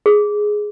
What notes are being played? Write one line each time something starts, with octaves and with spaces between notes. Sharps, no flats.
G#4